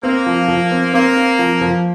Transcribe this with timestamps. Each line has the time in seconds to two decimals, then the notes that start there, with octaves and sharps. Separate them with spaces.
0.03 A#3 C4
0.26 F3
0.48 F3
0.71 C4
0.94 A#3 C4
1.17 C4
1.39 F3
1.61 F3